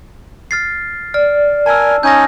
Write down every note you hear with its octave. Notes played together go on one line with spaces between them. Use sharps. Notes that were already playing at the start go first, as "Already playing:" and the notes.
F6 A6 C7
D5 F6
A#4 G#5 A5 E6
C#4 D#4 G#5 G6 A#6